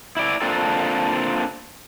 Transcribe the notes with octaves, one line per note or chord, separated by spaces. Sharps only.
E4 D5
A#3 C4 D4 F4 A4